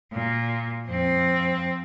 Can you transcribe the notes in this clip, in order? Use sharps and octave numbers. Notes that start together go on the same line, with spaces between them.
A#2
F2 C4